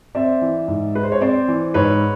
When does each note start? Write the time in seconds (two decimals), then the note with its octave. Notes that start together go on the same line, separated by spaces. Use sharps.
0.15 C4 D5 E5
0.42 E3
0.68 G#2
0.95 G#3 B4
1.03 C5
1.12 C#5
1.21 C4 C5 D5
1.48 E3
1.74 G#2 B4 C#5